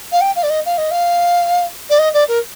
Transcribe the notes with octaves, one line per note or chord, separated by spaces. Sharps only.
F5
G5
F5
D5
D#5
F5
D#5
F5
D5
D#5
D5
A#4